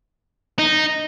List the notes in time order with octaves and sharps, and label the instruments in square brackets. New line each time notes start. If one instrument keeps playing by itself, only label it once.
[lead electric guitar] D#4